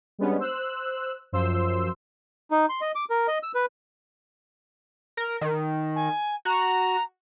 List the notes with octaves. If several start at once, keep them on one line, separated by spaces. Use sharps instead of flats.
G3 G#3 B3 C#4 D4
C5 E6 F#6
F#2 F3 C5 C6 E6
D#4
C6
D#5
D6
A#4
D#5
E6
B4
A#4
D#3
G#5
F#4 A#5